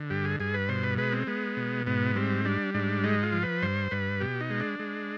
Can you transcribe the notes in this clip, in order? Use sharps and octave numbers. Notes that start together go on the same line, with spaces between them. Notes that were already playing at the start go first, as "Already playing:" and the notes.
Already playing: D3
G2 G4
G#4
G2 G#4
B4
B2 C5
B4
G#3 B4
C4
G#3 B3
B2
G#2 B3
G3 C4
G3 D4
G#2 D4
G#3 D#4
F4
F3
B4
G2 C5
G2 B4
B2 G4
D#4
G#3
D4
G#3